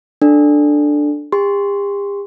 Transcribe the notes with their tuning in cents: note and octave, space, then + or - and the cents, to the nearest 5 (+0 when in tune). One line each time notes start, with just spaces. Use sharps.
D4 +5 A4 +0
G4 +45 C6 +0